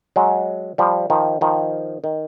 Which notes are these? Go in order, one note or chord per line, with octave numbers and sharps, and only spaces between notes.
F#3 G#3
F3 G3
D#3 F3
D#3 F3
D#3